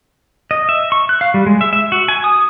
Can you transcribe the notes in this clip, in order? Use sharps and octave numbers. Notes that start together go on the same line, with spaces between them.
D#5
E5
C#6
F#6
F5
G3
G#3
E5
E5
F#4
G#5
D#6